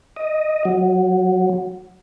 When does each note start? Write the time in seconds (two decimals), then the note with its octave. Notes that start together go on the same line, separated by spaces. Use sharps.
0.16 D#5
0.65 F#3